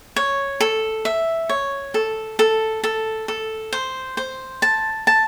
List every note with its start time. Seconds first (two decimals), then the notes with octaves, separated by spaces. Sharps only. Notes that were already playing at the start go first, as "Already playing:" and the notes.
0.16 C#5
0.60 A4
1.05 E5
1.49 C#5
1.94 A4
2.39 A4
2.84 A4
3.28 A4
3.73 C5
4.17 C5
4.62 A5
5.07 A5